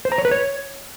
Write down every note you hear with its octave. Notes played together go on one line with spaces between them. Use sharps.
C5
A#5
C#5
B4
C#5